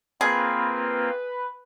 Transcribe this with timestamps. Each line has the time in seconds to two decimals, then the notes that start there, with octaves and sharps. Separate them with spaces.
0.21 A#3 C4 F4 G#4 B4